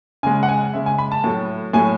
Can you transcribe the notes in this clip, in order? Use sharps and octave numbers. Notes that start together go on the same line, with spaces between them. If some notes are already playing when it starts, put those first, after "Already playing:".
C#3 G#3 G#5
F#5
G#5
C#3 G#3 E5
G#5
B5
A5
A2 F#3 A3
A2 F#3 A3 G#5